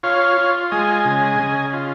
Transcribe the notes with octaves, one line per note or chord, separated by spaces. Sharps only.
F4 C#5 F5
F4
G#3 D#5 G#5
C#3
C#3
F4